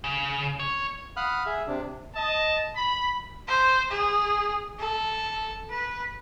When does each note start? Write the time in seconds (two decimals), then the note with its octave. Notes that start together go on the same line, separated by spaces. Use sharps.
0.04 C#3
0.59 C#5
1.17 F5 F#5 B5 D#6 F6 F#6
1.46 G#4 E5
1.67 C3 D4
2.15 D#5 A5
2.76 B5
3.48 C5
3.91 G#4
4.79 A4
5.70 B4